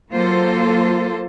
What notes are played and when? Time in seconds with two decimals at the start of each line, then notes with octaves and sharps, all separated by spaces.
0.10 F#3 A#3 F4 A4 C5